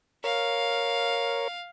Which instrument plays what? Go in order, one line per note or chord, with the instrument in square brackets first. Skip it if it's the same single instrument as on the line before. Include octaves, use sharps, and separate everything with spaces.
[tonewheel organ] A#4 C#5 [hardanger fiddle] F5